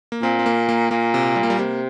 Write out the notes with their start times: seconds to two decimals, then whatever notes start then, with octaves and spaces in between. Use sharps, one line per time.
0.12 A#3
0.23 A#2 C4
0.39 C4
0.46 A#3
0.69 A#3
0.91 A#2 A#3
1.14 C3
1.36 G3
1.43 A#3
1.50 G3
1.59 C3 A#3